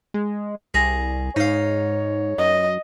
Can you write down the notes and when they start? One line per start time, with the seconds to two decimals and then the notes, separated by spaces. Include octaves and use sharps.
0.14 G#3
0.74 C2 G#4 A#5
1.36 G#2 D#4 C#5 F5
2.38 F#2 D#5